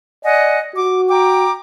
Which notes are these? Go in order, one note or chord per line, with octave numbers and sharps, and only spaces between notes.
D5 D#5 F#5 G#5
F#4 D6
G5 A#5 D6